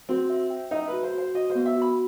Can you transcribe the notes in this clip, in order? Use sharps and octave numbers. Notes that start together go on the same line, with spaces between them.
C4 F#4
E5
G5
D#4 E5
F#4 B4
C5
F#4 C5
F#4 D#5
C5
B3
E5
F#4
B5